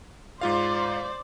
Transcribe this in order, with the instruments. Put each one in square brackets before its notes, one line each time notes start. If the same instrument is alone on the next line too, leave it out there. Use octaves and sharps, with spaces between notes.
[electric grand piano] G#2 F4 F5 [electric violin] C5 D5